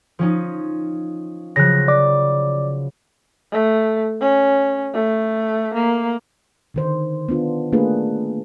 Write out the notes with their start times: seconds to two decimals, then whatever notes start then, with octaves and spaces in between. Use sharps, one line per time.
0.19 F3 C#4 D#4
1.56 C#3 F3 F#3 F#6 A#6
1.88 D5 D6
3.52 A3
4.21 C#4
4.94 A3
5.74 A#3
6.74 D3 D#3 C5
7.29 B3 D4 F4
7.72 A3 A#3 D4 F4 G#4 B4